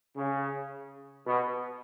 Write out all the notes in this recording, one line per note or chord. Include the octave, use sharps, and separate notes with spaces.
C#3
B2